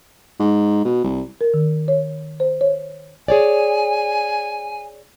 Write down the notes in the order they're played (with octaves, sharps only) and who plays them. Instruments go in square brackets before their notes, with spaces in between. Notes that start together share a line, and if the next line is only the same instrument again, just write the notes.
[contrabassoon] G#2
B2
C2
[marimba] A#4
D#3
C#5
C5
C#5
[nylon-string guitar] G#4 C#5 D5 [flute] G#5